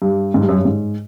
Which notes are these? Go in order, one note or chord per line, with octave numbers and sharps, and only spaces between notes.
G2
G#2
G2
F#2
G2
G#2